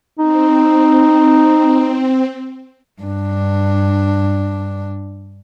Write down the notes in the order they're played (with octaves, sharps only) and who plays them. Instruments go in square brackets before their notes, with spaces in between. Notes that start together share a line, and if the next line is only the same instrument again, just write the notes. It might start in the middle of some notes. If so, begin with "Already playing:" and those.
[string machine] C4 [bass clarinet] D#4
[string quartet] G2 D4